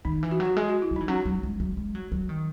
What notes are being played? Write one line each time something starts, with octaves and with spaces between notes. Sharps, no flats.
D#3 D#4
E3
F#4
F#3
F#4
G#3 G#4
F#4
E4
F#3
D#4
E3
F#3 C#4
F#3
G#3
F#3
G#3
F#3
F#3
D#3